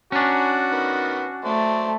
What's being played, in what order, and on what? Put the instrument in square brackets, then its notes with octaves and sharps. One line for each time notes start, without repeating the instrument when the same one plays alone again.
[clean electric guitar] C#4 D4 [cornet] F#4 [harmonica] G#5 A#5
[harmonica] D#3 B3
[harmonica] F#3 C5 D5 [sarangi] A3